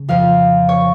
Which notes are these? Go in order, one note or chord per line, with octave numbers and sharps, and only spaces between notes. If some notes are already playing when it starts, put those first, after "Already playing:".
Already playing: C#3
F2 F3 F5
C#5